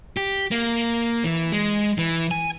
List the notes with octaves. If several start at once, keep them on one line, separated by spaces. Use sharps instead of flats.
G4
A#3
E3
G#3
E3
G#5